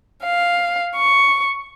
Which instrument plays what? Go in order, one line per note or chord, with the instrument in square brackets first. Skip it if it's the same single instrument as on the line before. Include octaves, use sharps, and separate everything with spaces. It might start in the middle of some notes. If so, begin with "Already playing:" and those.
[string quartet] F5
C#6